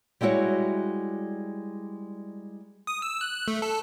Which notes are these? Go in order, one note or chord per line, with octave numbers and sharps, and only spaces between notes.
G3 G#3 E4 F#4 C#5
D#6
E6
F#6
A3
A4